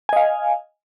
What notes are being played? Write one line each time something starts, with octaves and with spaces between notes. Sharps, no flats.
D#5 F5 G#5